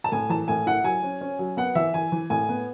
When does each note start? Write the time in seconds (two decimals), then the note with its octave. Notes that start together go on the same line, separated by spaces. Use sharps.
0.04 A5
0.12 A2 G#5
0.29 E3 A5
0.48 A2 G#5
0.66 E4 F#5
0.84 F#3 G#5
1.02 C#4
1.21 C#4
1.39 F#3
1.57 B3 F#5
1.75 E3 E5
1.94 E3 G#5
2.12 E3
2.30 A2 G#5
2.49 B3